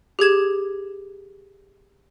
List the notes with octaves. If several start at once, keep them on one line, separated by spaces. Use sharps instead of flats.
G4 G#4 G#6 E7